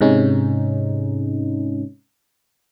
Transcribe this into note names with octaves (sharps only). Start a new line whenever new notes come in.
G#2 C3 G#3 C#4 D#4